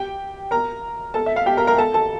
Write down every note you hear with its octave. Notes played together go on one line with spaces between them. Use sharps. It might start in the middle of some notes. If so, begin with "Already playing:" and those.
Already playing: G4 G5
A#4 A#5
A4 A5
E5
F5
G4 G5
A#4 A#5
A#4 A#5
A4 A5
A4 A5